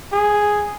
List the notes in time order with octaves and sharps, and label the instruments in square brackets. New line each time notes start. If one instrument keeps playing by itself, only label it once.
[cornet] G#4